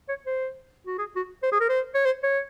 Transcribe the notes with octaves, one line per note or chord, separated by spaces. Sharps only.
C#5
C5
F#4
G#4
F#4
C5
G#4
A#4
C5
C#5
C5
C#5